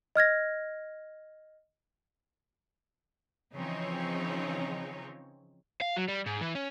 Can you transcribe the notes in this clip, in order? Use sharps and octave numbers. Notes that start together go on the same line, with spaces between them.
D#5 F6 G#6 A#6
C#3 E3 F3 C4 D#4 C#5
F5
F#3
G3
G#2
E3
C#4